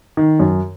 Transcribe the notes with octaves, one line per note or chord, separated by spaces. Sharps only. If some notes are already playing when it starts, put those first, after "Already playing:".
D#3
F#2